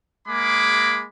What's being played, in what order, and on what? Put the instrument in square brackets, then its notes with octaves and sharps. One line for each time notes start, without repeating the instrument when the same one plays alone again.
[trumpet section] G#3 A#3 G#4 B5 D6